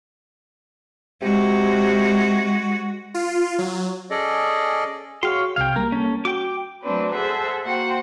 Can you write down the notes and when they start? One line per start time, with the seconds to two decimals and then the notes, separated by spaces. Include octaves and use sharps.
1.22 C3 G#3 F#4
3.14 F4
3.58 F#3
4.10 C#4 G#4 A4 D5 D#5
5.23 F#4 G#4 C#5 F5 G5 C6
5.56 C2 C3 F5 G5 G#6
5.76 G3 A#3 A#4
5.92 C#4 A4
6.25 F#4 G5 D6
6.83 F#3 A3 C4 D4 B4
7.14 G#4 A4 C5 E5 F#5
7.63 A#3 F#4 C5 F#5 G5